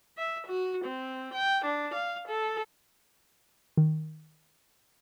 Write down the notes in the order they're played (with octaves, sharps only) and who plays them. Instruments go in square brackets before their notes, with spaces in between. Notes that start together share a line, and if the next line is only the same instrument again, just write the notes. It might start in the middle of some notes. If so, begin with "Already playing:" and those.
[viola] E5
F#4
C4
G5
D4
F5
A4
[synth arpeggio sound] D#3